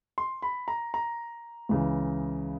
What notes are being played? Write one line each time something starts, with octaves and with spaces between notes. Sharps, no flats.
C6
B5
A#5
A#5
C#2 C#3 E3